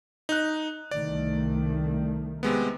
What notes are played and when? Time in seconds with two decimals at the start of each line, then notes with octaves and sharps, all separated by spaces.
0.29 D#4 F#6
0.91 C2 D#3 A3 D5
2.43 C3 G#3 B3